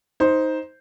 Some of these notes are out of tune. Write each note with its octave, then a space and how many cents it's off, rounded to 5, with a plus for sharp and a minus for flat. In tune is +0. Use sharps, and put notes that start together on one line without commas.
D#4 +15 C5 +0